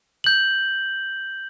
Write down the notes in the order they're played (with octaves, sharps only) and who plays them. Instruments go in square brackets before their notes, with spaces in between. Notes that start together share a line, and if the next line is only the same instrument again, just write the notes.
[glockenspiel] G6 F#7